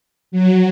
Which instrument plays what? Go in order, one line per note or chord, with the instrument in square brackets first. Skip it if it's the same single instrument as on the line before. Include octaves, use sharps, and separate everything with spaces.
[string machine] F#3